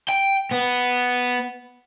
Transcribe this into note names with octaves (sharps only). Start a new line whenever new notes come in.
G5
B3